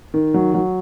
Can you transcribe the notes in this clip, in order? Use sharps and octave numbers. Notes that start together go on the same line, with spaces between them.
D#3
F#3
F#3